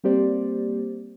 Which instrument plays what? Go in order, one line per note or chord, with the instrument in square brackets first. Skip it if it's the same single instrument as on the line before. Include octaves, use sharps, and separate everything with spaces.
[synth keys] G3 A#3 C4 G4 C5 D5